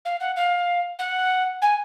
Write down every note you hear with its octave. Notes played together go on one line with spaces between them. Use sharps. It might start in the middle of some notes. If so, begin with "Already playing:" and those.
F5
F#5
F5
F#5
G#5